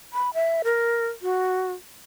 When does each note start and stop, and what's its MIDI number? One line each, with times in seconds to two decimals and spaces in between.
0.13 0.33 83
0.34 0.62 76
0.64 1.08 70
1.22 1.72 66